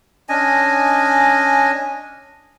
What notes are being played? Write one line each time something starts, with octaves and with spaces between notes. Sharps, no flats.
C#4 D4 D#5 G#5